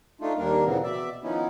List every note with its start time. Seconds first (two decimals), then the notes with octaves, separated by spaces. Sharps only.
0.21 A3 D4 D#4 F4
0.38 D#2 G3 A#3 D4 A#4
0.65 A#2 C#3 E3 B3 C4
0.83 B2 D5 E5
1.23 D#3 F3 B3 C#4 D#4 E4